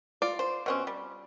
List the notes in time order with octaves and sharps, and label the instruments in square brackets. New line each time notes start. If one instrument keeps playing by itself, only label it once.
[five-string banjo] F4 D5
[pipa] C5
B2 C4 C#4
G3